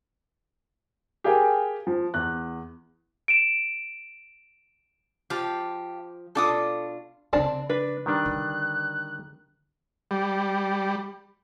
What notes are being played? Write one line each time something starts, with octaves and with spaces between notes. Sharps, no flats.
G4 G#4 A#4 F5 G5 G#5
F3
E2 F#6
D7 E7
F3 G4 F5 A5
B2 D4 F4 A4 D6 D#6
C#3 F3 C4 D4 A5
D4 B4
D#3 G3 D4 F#6
D3
G3